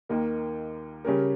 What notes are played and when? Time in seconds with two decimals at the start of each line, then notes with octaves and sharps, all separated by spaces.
0.09 D#2 D#3 A#3
1.04 C#3 G3 C#4 G4 A#4